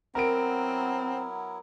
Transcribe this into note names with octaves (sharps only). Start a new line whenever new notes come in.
F#3 B3 C4 E4 A#4 A#5 D7